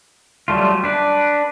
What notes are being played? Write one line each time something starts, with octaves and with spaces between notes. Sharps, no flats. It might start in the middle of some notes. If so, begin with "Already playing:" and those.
F#3 G3 A3 F4
D4 B4